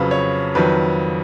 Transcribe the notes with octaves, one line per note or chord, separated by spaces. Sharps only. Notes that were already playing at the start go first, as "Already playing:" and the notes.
Already playing: F2 C#3 F#3 B4
C#5
F2 D#3 F#3 B4